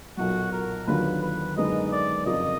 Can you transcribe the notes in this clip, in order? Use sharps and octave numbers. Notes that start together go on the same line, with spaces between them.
B1 A#2 F#3 F#4
A#4
D#2 D3 F#3 B3 F4 B4
B4
F#2 D3 G#3 B3 D#4 D#5
D5
F#1 F2 F3 A#3 F4 D#5